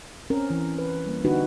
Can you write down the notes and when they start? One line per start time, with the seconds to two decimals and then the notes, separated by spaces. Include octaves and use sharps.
0.30 C4 C#4 A#4
0.50 E3
0.79 B4
1.06 G3 A#3
1.25 D3 D4 D#4 F#4 G4 B4